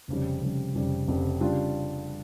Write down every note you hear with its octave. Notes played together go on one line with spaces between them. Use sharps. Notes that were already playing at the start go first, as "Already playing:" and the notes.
F1 F2 C#3 G3
F1 F2 C#3 G3
F1 F2 C#3 G3
F1 F2 C#3 G3
C#3 G3 D4 F4